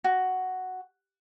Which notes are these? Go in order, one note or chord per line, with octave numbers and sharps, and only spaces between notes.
F#4